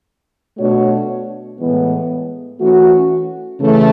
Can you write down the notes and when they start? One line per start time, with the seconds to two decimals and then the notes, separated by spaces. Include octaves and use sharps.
0.58 B2 A3 D4 F#4 C#5
1.59 A2 E3 G#3 B3
2.59 E3 A3 C#4 F#4
3.60 C#3 E3 A3